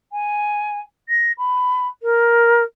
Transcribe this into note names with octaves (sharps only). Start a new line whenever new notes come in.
G#5
A#6
B5
A#4